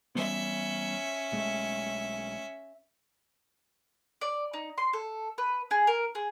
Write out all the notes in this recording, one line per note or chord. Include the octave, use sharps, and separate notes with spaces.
E3 G3 B3 C#4 E5
B1 G#3 A3
D5
D#4
C6
A4
B4
G#4
A#4
G#4